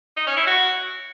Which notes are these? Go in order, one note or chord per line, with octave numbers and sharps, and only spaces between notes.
D#4
C#4
E4
F#4